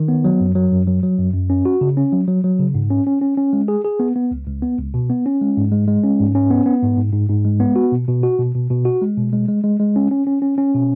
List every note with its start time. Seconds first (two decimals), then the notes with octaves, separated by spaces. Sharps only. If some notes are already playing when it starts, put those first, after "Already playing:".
Already playing: D#3
0.08 B3
0.24 F#3
0.40 F#2
0.55 F#3
0.71 F#2
0.87 F#3
1.03 F#3
1.18 F#2
1.34 F#2
1.50 C#4
1.65 F#4
1.81 C#3
1.97 C#4
2.12 F#3
2.28 F#3
2.44 F#3
2.59 C#3
2.75 G#2
2.90 C#4
3.07 C#4
3.22 C#4
3.37 C#4
3.53 G#3
3.68 G#4
3.84 G#4
4.00 B3
4.16 B3
4.31 C#2
4.47 C#2
4.62 B3
4.78 C#2
4.94 B2
5.10 B3
5.26 C#4
5.42 G#3
5.57 G#2
5.72 G#3
5.88 G#3
6.04 C#4
6.20 G#2
6.35 C#4
6.51 B3
6.66 B3
6.82 G#2
6.97 G#2
7.13 G#2
7.29 G#2
7.45 G#3
7.60 B3
7.76 F#4
7.92 B2
8.08 B2
8.23 F#4
8.39 B2
8.55 B2
8.70 B2
8.85 F#4
9.01 G#3
9.17 B2
9.33 G#3
9.48 G#3
9.64 G#3
9.80 G#3
9.96 C#4
10.11 C#4
10.27 C#4
10.42 C#4
10.58 C#4
10.74 B2